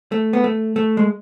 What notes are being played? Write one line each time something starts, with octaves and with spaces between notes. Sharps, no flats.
A3
B3
A3
A3
G#3